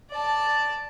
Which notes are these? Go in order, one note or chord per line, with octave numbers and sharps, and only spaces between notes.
D5 A5